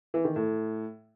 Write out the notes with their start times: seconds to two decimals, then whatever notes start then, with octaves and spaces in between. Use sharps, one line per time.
0.14 E3
0.25 D#3
0.36 A2